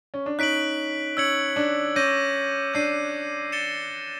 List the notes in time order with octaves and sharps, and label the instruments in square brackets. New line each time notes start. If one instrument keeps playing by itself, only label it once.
[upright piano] C#4
D4
[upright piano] C#4 D#4 [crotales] F#6 B6 D7 F#7
[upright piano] C#4 [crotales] E6 G#6 C#7 F#7
[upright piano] D4
[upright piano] C#4 [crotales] D6 G6 A#6 D#7
[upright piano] D4 [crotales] G6 C7 D#7
[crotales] A6 C#7 E7 G7